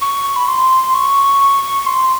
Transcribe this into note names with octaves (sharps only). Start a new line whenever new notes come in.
C#6
B5
C6
C#6
C6